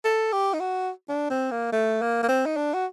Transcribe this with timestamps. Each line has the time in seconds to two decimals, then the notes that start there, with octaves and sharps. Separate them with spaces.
0.05 A4
0.32 G4
0.54 D#4
0.60 F#4
1.09 D4
1.31 C4
1.51 A#3
1.72 A3
2.02 A#3
2.23 A#3
2.29 C4
2.46 D#4
2.57 D4
2.74 F#4